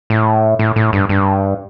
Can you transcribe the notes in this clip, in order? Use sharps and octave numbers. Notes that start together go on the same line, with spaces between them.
A2
A2
A2
G2
G2